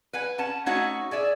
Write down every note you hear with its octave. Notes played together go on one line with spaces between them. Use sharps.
B4 F#5 G#5
C#4 F#5 A5
A3 C#4 D#4 F#4 C#5 F#5
G#4 D5 E5